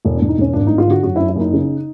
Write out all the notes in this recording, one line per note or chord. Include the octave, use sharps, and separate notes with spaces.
E1
D4
E1
D#4
E1 C#4
G#1 D4
G#1 D#4
F4
D3 F#4
F#2 F#4
F#2 E4
E4
F#1 D#4
C#3